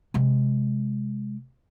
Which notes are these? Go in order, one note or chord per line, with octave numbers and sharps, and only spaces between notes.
C3 G#3